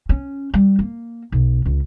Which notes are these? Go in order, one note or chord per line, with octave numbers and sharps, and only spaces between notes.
C#4
G3
A#3
B1
C#2